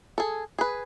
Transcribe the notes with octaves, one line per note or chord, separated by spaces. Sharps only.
G#4 A4
G#4 B4